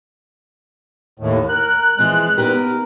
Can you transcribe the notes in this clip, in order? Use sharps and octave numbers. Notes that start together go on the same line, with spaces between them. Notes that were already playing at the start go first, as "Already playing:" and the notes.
D#2 A2
A#4 F#6
E3 F3 G#3 C4
B3 D#4 G4 A#4